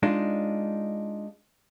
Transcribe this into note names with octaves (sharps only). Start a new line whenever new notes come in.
G#3 D4 D#4 F4